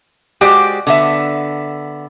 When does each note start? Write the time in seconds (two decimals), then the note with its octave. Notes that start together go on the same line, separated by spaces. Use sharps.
0.41 G#3 F#4 G4 C5 D5
0.87 D3 B3 E5